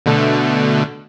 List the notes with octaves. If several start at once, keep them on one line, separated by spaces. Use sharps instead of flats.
B2 D3 A3